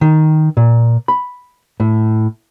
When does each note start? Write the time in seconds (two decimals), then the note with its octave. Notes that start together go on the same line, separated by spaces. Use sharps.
0.01 D#3
0.57 A#2
1.08 B5
1.80 A2